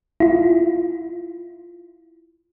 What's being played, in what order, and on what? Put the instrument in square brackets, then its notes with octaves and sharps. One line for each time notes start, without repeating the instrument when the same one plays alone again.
[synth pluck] E4 F4